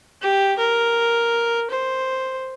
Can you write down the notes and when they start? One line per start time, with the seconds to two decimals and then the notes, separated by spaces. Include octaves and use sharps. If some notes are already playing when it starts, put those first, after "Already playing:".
0.22 G4
0.58 A#4
1.70 C5